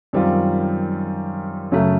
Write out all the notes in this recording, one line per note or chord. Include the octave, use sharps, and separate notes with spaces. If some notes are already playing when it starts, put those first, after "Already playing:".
F#2 D#3 G3 C4 F4
F#2 C#3 F#3 A3